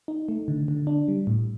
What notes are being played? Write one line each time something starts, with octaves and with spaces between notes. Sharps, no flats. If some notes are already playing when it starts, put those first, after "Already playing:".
D#4
A3
D3
D3
D4
G3
A2